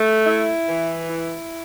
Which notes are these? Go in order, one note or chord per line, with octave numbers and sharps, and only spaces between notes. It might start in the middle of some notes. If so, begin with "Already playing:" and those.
Already playing: A3
E4
E3
E4